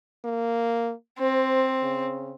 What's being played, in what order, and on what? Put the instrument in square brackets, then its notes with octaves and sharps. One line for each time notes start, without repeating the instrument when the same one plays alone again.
[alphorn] A#3
[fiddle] C4 [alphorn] C5
[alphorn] C#3